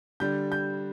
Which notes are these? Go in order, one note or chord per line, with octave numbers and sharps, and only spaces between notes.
D3 G3 G6
G6